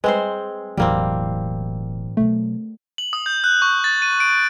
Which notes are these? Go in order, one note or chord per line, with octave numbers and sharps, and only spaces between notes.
G3 G#3 C4 B4 C5
E1 A2 E3 F#3 G3 A#3 C4
B2 F#3 A3
F#7
D#6
G6
F#6
C#6
A6
D#7
D7